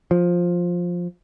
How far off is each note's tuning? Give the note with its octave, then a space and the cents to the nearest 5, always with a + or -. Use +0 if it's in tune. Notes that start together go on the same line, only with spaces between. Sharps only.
F3 +10